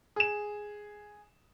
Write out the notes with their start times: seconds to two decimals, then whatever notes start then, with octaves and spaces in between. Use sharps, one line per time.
0.16 G#4 E7